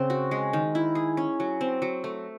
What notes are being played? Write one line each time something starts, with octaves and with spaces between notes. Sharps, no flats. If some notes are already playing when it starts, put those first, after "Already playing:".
Already playing: C#3 C4
F#4
G#3
D#3
E4
G#4
C#4
F#3
C4
F#3
A3